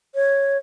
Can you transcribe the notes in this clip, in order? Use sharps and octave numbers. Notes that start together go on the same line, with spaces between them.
C#5